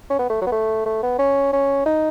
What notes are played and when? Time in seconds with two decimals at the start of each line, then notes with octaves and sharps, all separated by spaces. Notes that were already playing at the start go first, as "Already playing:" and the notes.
0.10 C#4
0.19 B3
0.30 A3
0.41 F#3
0.47 B3
0.52 A3
0.86 A3
1.03 B3
1.19 C#4
1.53 C#4
1.86 D#4